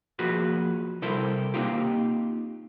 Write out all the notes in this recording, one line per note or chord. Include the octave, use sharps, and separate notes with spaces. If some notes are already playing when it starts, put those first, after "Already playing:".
F3 A#3 F#4 G#4 B4
C3 G3 E4 A4 A#4 C5
A#3 C4 D#4 F4 G4